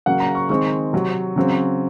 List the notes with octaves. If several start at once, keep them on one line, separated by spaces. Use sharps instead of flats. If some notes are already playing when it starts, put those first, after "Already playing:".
C#3 F#3 A#3 F#5
A#5
C#6
D#3 G#3 C4 C#6
C3 F#3 C4
C#3 F#3 C4